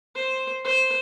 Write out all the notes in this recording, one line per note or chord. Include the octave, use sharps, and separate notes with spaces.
C5
C5